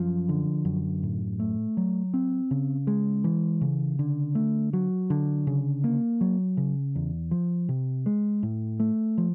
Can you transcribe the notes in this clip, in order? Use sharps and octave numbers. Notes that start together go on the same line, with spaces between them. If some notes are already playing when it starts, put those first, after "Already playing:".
Already playing: F#2 F3
D3
F#2
A2
A3
F#3
C4
C#3
G#3
E3
C#3
D3
A3
F#3
D3
C#3
A#3
F#3
C#3
E2
F3
C3
G#3
A2
A3
F3